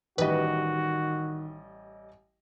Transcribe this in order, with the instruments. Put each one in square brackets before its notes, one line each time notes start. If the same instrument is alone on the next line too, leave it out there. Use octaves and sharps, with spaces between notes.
[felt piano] A1 G3 D#5 [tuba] D#3 [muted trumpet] F#4 [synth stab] B4